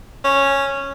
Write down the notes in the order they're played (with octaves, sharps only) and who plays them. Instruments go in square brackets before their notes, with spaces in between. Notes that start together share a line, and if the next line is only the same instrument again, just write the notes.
[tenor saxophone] C#4